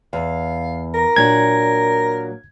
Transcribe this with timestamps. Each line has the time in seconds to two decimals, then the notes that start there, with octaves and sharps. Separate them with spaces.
0.13 E2 F5
0.94 A#4
1.16 A#2 F#3 D4 G#6